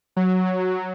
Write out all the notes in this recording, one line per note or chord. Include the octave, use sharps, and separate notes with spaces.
F#3